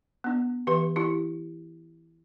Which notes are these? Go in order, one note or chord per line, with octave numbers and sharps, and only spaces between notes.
B3 D4
E3 G4 B4
E4 G4